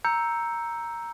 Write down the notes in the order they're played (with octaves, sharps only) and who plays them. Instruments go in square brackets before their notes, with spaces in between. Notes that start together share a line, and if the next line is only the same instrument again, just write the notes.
[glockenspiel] A#5 E6 G6 C#7